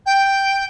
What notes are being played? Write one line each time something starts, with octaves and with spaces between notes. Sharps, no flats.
G5